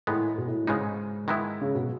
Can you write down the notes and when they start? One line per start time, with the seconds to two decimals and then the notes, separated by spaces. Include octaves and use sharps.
0.07 A2 D#3 G#3 B3
0.38 B2
0.48 A2
0.67 G#2 C#3 G#3 B3 D#4
1.28 D#3 G#3 B3 E4
1.61 C#3
1.75 B2